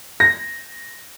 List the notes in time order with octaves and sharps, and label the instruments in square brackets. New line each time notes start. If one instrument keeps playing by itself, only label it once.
[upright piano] A#6